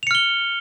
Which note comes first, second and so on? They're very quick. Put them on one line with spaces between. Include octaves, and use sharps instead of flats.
F7 C#7 F6 G7